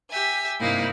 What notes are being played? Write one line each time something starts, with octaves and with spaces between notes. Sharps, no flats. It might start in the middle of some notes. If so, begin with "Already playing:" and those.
G4 E5 G#5
G2 C3 A#3 D#4 E4 F5